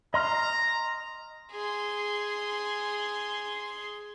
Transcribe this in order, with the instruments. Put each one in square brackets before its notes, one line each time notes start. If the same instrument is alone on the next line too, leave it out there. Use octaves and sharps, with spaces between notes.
[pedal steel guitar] D#5 C6 F6 [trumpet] A#5
[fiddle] G#4 C6